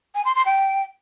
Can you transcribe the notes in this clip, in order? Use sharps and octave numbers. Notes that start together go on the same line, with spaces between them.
G#5
C6
C6
G5